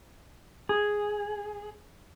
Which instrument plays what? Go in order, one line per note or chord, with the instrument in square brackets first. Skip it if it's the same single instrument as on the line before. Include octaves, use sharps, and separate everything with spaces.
[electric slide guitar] G#4